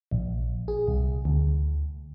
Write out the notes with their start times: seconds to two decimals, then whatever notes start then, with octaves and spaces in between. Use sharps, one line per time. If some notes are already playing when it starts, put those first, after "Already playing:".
0.11 A#1
0.68 G#4
0.88 C2
1.25 D2